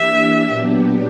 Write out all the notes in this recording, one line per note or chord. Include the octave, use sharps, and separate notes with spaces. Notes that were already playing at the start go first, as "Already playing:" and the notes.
Already playing: E3 A#3 D4 G4 E5
A#2 F#3 B3 D4 G4